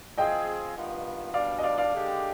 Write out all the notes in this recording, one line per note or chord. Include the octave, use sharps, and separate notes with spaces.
F3 C4 F4 G#4 D#5 G5
G2 D#3 B3 F4
B2 G3 D4 D5 F5
D#5
D5 F5
D5 F5
D3 G#3 D4 G4